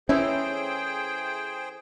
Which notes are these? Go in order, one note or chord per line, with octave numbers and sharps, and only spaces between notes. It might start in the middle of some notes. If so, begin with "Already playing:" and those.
E3 A3 C#4 E4 G#4 C5 G5